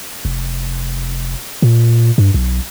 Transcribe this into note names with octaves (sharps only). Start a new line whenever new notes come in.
F1
A#2
G2
B1